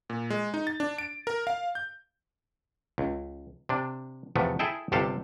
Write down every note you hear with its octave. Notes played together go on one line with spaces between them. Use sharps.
A#2
G#3
D#4
A6
D4
D7
A#4
F5
G6
C#2
C3 D4
E2 C3 F3 A3 B3
E4 G#4 A4 E5 G5
G1 C3 G4 A4 F5